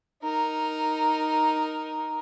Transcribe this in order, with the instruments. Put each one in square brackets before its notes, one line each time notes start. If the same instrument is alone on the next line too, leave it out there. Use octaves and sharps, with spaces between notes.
[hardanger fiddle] D#4 A#4